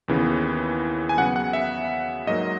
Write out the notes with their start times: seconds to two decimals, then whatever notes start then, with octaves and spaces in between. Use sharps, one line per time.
0.08 D#2 C#3 E3 B3
1.09 G#5
1.17 C#3 F#3 B3 F#5
1.36 F#5
1.53 E5
2.27 G#2 F#3 A#3 D#5